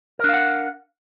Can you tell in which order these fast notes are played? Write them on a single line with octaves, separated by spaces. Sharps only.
A#4 D4 F5 F#5